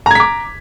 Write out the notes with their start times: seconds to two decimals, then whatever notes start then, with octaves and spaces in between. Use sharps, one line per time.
0.06 A#5
0.11 G#6
0.15 B6
0.20 D6